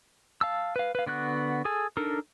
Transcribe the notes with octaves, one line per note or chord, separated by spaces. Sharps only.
F5 A5 E6
B4 F5
B4 F5
D3 B3 F#4 F#6
G#4 A4 G#5
D4 D#4 A4 A#4